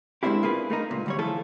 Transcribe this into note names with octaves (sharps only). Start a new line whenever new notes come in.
G#3 A#3 C4 D4 E4 G4
A#3 F4 G#4 B4
A3 A#3 D#4
C#2 A#2
D2 G3 C#5
E3 F3 A3 F4 G#4 A4